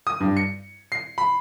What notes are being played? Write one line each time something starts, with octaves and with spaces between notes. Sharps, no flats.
D#6
G2
C#7
C7
B5